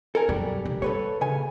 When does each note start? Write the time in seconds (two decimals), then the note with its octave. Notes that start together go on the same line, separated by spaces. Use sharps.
0.15 A4 A#4 G#5
0.29 F#2 B2 G3
0.65 F1
0.82 A#3 A4 B4 C#5
1.21 C#3 G#5